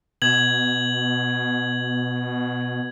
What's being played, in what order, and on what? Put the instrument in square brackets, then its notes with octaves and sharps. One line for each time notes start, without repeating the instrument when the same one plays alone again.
[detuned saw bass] B2 [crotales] G#6 F#7